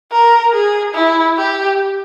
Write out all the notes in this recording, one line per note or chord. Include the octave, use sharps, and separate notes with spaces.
A#4
G#4
E4
G4